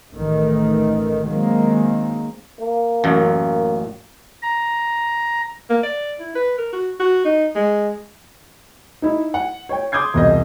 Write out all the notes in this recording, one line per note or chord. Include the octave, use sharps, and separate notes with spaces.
A1 D#3 A3
D#3 F#3 G#3 A#3 C4
A#3
A1 F#2
A#5
A#3
D5
E4
B4
A#4
F#4
F#4
D#4
G#3
D#4 E4
F#5
C#5 G5
C6 D6 D#6 G6 G#6 C7
E1 C2 D#5